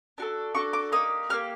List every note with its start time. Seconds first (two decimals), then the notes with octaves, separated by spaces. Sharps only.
0.18 D4 F#4 A4
0.55 D4 F#4 A4 C#6
0.73 D6
0.92 A#3 D#4 G4 D#6
1.30 A#3 D#4 G4 F6